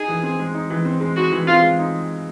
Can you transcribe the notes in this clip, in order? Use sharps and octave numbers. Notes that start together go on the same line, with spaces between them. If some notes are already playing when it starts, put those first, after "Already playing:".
Already playing: D#4 G#4
E3
C4
G#3
D#4
E3
C4
G#3
D#4 F#4
E3
C4 F4
G#3
D#4